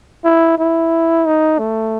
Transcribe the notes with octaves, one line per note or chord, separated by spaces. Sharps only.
E4
E4
D#4
A3